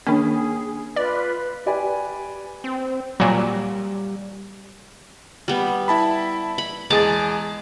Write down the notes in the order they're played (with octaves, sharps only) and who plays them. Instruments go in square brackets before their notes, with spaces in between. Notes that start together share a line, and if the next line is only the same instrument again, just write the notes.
[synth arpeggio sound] D#3 C#4 [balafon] A#3 D4 [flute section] G#4
[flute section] F4 B4 [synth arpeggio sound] D5
[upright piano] G4 B4 D5 G#5 B5
[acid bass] C4
[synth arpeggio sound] A#2 F#3 [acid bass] G3
[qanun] G3 B3
[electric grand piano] E4 A5 B5
[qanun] B5
[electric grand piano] E2 G#4 A6 [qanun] G#3 A5 D6